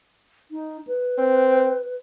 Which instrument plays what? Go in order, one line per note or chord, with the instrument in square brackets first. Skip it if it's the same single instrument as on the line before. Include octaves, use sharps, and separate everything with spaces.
[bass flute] D#4
B4
[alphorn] C4